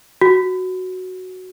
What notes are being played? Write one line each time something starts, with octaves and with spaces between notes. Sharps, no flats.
F#4